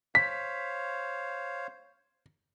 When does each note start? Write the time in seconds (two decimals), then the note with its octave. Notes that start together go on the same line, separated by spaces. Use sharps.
0.15 C5 C#5 F5 B6